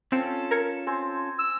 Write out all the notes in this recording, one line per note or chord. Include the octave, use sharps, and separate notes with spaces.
C4 C#4 F4 A4
A#4 G#6 C#7
C4 G#5 C6
E6